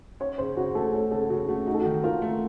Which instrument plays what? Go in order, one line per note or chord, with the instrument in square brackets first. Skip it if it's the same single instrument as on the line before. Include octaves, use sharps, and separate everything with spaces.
[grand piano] C#4 [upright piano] C#5
[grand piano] C#3 [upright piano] C5
[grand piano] C#3 [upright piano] F#4
[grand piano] A3 [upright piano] A4
[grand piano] C#4 [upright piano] A4
[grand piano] C#3 [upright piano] A4
[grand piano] C#3 [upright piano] F#4
[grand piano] A3 [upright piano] F#4
[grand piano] D#4 [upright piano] F#4
[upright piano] A4
[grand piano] D#3 [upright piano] F#4
[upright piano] F4 [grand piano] A#4
[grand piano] A3